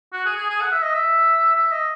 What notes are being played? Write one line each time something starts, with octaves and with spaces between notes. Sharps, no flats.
F#4
G#4
G#4
G#4
F#5
E5
D#5
E5
E5
D#5